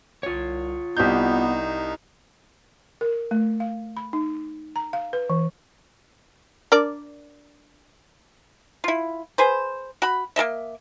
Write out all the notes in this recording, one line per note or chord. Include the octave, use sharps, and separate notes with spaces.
C2 F4 C#5
C2 B3 D#4 G4 G6
A#4
A3
F5
B5
D#4
A#5
F5
B4
E3
D4 A#4 D5
E4 F4
G#4 B4 C5
F#4 B5
A#3 A4 D#5 E5